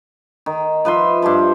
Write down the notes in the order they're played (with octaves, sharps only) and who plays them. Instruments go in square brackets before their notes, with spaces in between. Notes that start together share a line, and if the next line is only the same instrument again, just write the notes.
[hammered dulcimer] D#3
F3 B4 E5 C6
G2 G4 A5 C6